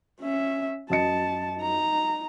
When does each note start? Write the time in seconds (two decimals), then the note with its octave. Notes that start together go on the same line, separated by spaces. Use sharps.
0.21 C#4 E5
0.90 F#2 D#5 A5 C#7
1.57 D#4 A#5